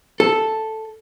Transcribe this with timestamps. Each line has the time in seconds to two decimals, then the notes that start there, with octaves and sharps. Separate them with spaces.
0.20 A4